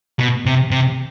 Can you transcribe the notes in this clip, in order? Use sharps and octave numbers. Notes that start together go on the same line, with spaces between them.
B2
C3
C3